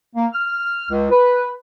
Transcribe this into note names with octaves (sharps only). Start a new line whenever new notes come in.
A#3
F6
C#2
B4